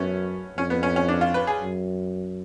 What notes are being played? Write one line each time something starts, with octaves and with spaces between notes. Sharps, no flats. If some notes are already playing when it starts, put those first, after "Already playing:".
Already playing: F#2 A3 B3 C#4
F2 C#4
B3
C#4
C#4
D4
F4
B4
G#4
F#2